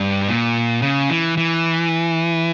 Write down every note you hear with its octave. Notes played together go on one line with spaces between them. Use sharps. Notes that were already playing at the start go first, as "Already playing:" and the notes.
Already playing: G2
A#2
C#3
E3
E3